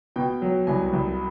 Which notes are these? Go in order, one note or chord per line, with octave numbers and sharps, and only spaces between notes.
B2 G5
F#3
C2 G#5
C2